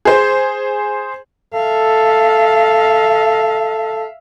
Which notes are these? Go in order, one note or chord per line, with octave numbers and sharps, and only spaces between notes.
G#4 C5
A4 E5 F5